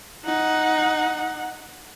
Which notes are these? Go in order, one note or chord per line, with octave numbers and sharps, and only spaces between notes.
D#4 F#5